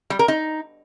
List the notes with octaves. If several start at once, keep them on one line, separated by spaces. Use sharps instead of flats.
G3
A#4
D#4